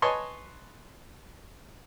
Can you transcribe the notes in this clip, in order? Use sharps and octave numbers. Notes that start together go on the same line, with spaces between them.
B4 C#5 D#5 G#5 A5 C6